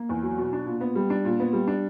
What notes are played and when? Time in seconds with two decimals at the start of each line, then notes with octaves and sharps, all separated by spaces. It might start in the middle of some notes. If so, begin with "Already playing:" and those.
Already playing: A#3
0.09 E2
0.23 F#3
0.38 B2
0.53 D4
0.66 A#2
0.81 B3
0.95 G3
1.10 D4
1.25 A#2
1.40 B3
1.53 G3
1.68 D4